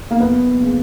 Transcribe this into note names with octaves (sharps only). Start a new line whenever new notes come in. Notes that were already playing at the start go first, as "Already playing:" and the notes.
A#3
F#1 B3
C#3